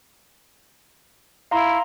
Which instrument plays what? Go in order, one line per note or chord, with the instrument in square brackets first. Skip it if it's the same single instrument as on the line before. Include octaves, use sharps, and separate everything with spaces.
[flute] E4 [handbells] F5 A#5 C6